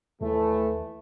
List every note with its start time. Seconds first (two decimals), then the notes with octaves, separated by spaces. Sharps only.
0.21 D#2 A2 E3 A3